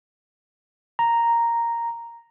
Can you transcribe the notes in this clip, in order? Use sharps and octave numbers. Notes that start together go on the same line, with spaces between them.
A#5